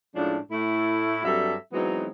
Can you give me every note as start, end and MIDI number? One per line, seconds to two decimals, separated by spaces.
0.15 0.37 45
0.15 0.37 53
0.15 0.37 56
0.15 0.37 61
0.15 0.37 62
0.50 1.23 45
0.50 1.23 57
0.50 1.23 64
1.24 1.54 43
1.24 1.54 54
1.24 1.54 55
1.24 1.54 60
1.24 1.54 69
1.24 1.54 76
1.72 2.06 52
1.72 2.06 54
1.72 2.06 56
1.72 2.06 59
1.72 2.06 60
1.72 2.06 63